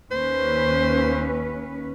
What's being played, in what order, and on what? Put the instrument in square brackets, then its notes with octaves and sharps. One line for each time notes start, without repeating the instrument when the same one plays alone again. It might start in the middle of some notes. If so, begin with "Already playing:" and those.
[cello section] D#2 C#4 B4 [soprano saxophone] C5